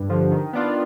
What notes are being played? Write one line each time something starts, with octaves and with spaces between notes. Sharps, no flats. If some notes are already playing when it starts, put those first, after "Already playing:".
Already playing: G2
D3 F3
D#3
B3 D4 F4